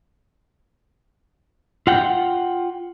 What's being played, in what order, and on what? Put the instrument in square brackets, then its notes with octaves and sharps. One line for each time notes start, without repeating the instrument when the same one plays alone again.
[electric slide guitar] F4 F#5 G5